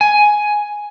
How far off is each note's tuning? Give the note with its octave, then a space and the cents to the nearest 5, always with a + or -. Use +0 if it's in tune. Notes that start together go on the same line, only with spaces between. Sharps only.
G#5 +5